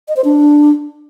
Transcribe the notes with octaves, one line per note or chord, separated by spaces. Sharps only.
D#5
C5
D4